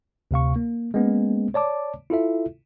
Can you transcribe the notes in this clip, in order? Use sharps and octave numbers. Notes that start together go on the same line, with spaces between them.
D2 C3 F5 C#6
A#3
G#3 A#3 B3 C#4
C#5 D5 A5 D6
E4 F4 A4 E5